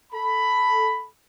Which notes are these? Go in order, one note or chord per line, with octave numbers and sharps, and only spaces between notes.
A4 B5